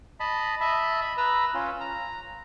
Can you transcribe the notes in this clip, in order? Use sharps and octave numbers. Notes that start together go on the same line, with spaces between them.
D#5 A5 B5
D#5 E5 A5 B5
B5
B4 A#5 E6
C#4 F4
A#5